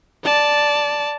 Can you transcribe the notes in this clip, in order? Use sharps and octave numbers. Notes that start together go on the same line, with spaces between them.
D5 A5